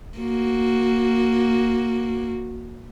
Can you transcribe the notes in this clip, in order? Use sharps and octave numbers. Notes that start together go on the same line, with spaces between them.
A#3 F#4